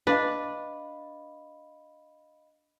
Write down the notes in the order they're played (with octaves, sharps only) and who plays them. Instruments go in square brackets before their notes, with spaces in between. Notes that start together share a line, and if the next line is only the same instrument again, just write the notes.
[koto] D4 [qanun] B4 [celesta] D#5 F5 B5